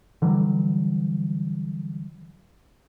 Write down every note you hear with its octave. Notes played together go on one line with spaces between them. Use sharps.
D3 E3 F#3 G3